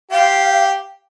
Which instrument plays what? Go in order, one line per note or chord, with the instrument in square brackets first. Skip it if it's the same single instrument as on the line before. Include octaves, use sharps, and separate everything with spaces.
[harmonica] G4 [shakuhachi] F5